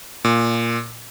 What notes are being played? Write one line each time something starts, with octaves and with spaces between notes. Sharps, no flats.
A#2